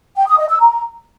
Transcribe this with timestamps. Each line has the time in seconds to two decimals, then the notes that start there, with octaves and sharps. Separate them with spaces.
0.16 G5
0.27 D#6
0.38 D#5
0.49 E6
0.60 A#5